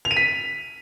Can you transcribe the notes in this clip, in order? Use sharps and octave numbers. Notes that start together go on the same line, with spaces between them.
F7
D#7
B6